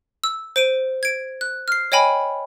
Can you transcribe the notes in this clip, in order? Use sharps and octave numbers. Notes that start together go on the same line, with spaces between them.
E6
C5 D7 D#7
G#6 D7
F#6
F6 C7
C#5 D#5 G5 G#5 B5